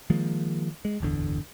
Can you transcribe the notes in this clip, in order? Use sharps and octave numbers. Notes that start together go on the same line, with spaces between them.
D#3 F3 G#3 A#3
G#3
D1 G1 E2 D3